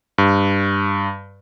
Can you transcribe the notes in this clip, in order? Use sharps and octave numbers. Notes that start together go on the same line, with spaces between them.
G2